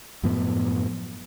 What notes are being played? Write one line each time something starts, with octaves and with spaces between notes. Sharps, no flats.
F#2 A2 F3 B3